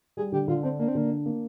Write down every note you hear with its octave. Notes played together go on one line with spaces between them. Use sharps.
G3 G#4
D3 G4
D3 F4
C4 D4
A#3 D4
C4
D3 A#3
D4
A#3